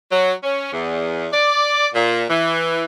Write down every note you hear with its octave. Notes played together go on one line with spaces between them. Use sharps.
F#3
C#4
E2
D5
A#2
E3